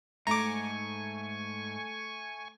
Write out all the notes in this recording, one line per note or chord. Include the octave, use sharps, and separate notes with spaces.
G#2 A3 G#5 A#5 C#6 D6